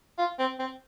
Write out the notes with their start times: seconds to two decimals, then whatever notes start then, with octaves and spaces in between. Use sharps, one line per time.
0.18 F4
0.39 C4
0.59 C4